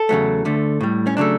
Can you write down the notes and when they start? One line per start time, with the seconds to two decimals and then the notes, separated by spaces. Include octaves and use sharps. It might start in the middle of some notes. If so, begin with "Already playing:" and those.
Already playing: A4
0.09 E2 C#3 F#3 A3
0.45 D2 D3 A3
0.81 A2 G3
1.07 C#4
1.17 C#3 F#3 A3 D4